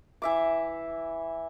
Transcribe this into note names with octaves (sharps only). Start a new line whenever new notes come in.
E3 E5 D6